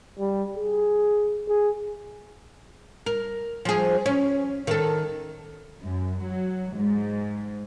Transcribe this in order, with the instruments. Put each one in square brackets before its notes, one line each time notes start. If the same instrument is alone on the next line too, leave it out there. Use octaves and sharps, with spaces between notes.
[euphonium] G3
G#4
G#4
[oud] A#4
F3 G#4
C#4
D#3 A4
[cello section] F#2
F#3
G#2